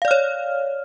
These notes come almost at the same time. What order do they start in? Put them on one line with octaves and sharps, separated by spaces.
F5 D5 F6 C#5